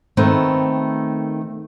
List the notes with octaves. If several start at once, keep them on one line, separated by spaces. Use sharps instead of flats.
D#3 A3 B3 C4